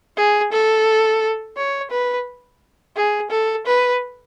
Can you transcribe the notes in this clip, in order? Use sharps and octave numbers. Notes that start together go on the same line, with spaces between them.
G#4
A4
C#5
B4
G#4
A4
B4